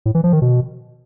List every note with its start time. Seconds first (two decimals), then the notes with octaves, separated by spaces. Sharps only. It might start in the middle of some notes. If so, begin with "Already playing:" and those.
0.06 A2
0.15 E3
0.24 F3
0.33 D#3
0.42 B2